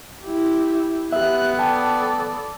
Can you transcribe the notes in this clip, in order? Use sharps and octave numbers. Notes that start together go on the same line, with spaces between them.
E4 G4
B3 G4 E5 F#6
A4 D5 G5 A5